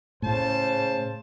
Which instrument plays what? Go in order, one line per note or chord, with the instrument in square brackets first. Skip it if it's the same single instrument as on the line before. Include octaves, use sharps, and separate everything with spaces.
[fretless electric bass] A2 [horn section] C#3 C5 A5